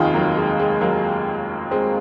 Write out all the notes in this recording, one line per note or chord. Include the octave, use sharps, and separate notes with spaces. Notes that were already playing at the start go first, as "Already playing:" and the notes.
Already playing: F1 D#2 D#3 F4 G#4
F#3 A#3
G#3
G#3
F#3 A#3
G#3 C4